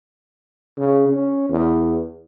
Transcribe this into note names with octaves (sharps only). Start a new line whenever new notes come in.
C#3
C#4
E2